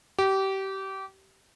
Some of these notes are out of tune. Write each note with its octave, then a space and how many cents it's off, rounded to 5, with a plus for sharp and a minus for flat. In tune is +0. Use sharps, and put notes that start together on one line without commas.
G4 -25